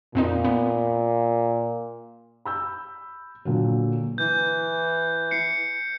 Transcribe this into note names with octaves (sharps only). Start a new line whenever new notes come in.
F2 A#2 C4 D#4
B3
B5 E6 G6
A#2 D3 F#3
E3 G6
C7 C#7